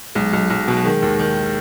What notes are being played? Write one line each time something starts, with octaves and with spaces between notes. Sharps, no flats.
B1 G#3 G#4
B1 F#3 F#4
B1 F#3 F#4
B2
D#3 G#3 G#4
D#2
D#3